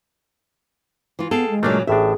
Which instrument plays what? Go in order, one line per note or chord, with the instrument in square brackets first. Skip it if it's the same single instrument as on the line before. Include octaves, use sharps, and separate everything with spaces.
[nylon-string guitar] E3 F4
[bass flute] B3 [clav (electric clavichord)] G#4 F5 G5 [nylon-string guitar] A4
[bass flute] G#3
[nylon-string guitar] A#2 C#3 F#3 [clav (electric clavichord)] A3 A#3 D4
[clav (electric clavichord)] A1 A2 D4 [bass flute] G#4 [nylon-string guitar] E5